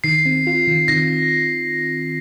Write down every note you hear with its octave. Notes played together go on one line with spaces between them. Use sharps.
D#3 C7
C4
F4
D#3
D#3 A#6